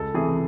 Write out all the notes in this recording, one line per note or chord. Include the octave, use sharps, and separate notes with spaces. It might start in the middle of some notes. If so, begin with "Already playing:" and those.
Already playing: C#2 A4
C3 E3 A3 G#4